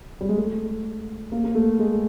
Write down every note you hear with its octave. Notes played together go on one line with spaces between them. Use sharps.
G3
G#3
A3
A#3
A#3
A3
G#3